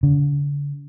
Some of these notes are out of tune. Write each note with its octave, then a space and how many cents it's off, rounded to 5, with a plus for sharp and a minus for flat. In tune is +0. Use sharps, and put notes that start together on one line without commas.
D3 -40